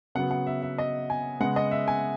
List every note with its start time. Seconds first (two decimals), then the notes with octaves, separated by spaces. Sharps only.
0.15 C#3 F#3 B3 F#5
0.31 F#5
0.47 E5
0.62 E5
0.78 D#5
1.10 G#5
1.40 C#3 G#3 B3 F#5
1.56 D#5
1.71 E5
1.88 G#5